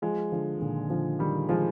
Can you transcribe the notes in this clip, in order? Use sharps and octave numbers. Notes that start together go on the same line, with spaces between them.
F3 G#3
D3 F3
D#3
A#2 D3
D3 F3
D#3 G3
F3 G#3